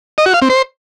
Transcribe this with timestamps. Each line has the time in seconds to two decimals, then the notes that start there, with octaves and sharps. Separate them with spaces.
0.18 D#5
0.26 F#4
0.34 F5
0.42 C4
0.50 C5